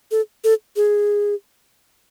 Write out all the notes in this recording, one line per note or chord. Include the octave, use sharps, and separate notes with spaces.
A4
A4
G#4